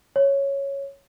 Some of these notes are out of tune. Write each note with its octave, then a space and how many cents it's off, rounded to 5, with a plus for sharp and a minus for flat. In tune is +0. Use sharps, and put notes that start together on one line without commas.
C#5 -5